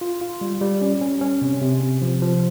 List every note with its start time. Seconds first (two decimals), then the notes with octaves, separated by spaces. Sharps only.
0.01 F4
0.21 F4
0.41 G3
0.61 G3
0.81 C#4
1.01 C#4
1.21 C#4
1.42 C3
1.62 C3
1.83 C3
2.02 F3
2.22 F3